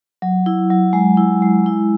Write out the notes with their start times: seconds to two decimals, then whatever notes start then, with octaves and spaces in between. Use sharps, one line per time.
0.22 F#3
0.46 E4
0.70 F#3
0.93 G#3
1.17 E4
1.42 G#3
1.66 E4